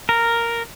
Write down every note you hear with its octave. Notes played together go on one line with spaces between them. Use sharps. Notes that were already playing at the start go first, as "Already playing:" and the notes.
A#4